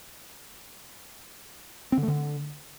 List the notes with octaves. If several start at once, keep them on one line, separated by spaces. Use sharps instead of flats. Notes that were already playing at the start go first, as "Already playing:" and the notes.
C4
D3
A3
D3